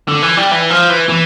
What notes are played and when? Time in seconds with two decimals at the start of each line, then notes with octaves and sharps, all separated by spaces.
0.08 D3
0.22 E3
0.37 G3
0.51 E3
0.70 F3
0.90 E3
1.09 E3